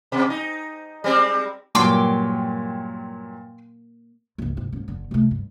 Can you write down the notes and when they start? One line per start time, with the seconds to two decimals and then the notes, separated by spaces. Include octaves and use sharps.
0.12 B2
0.30 D#4
1.04 G3 G#3 C4
1.75 G2 A#2 F#3 A#3 G5 C6 D6
4.38 G1 C#2
4.57 C2 G#2
4.73 G#2 C#4
4.88 F#1 D3
5.11 C3 A3
5.31 G2